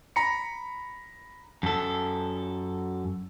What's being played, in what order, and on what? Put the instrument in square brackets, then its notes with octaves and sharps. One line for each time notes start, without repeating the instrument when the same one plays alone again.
[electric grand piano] A#5 B5 C#7
[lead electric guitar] F#2 A4